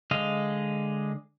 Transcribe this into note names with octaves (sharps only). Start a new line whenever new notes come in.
D3 G#3 D#5 F5